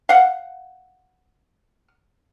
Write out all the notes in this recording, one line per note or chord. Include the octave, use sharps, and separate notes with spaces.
F5 F#5